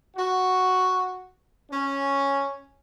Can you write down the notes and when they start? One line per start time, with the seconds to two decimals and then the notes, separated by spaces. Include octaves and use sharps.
0.16 F#4
1.71 C#4